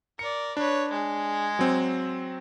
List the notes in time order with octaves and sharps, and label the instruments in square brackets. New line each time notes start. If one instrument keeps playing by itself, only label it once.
[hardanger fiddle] A#4 D5 [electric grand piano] C#7
[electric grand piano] D4 [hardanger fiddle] B4 C#5
[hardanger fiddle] G#3 G#4
[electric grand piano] F#3 C4